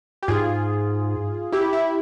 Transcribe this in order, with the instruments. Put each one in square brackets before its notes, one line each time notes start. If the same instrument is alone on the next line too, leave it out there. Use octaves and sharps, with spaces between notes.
[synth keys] G4
[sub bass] G#2 [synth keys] F4 G#4
[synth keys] E4 G4
E4